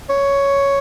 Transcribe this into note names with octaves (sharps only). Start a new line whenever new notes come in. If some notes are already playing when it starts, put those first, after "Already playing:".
C#5